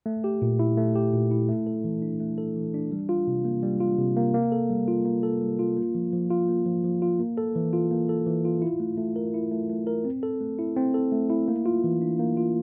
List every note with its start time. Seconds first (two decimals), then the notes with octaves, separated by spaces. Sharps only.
0.06 A3
0.24 G4
0.42 A#2
0.59 E4
0.77 A3
0.95 G4
1.13 A#2
1.31 E4
1.48 A3
1.67 A4
1.84 E3
2.02 D4
2.20 A3
2.38 A4
2.56 E3
2.74 D4
2.91 G3
3.09 F4
3.27 C3
3.45 A#3
3.63 G3
3.80 F4
3.98 C3
4.16 A#3
4.34 A#3
4.52 A4
4.70 G3
4.88 F4
5.05 A#3
5.23 A4
5.42 G3
5.59 F4
5.77 A#3
5.95 F3
6.13 F3
6.30 F4
6.48 A#3
6.66 F3
6.84 F3
7.02 F4
7.20 A#3
7.37 A4
7.56 E3
7.73 F4
7.91 A#3
8.09 A4
8.27 E3
8.45 F4
8.62 E4
8.80 A3
8.97 A3
9.16 A#4
9.34 E4
9.52 A3
9.69 A3
9.87 A#4
10.05 C4
10.23 A4
10.41 A3
10.59 E4
10.77 C4
10.94 A4
11.12 A3
11.30 E4
11.48 A#3
11.66 F4
11.84 E3
12.02 D4
12.19 A#3
12.37 F4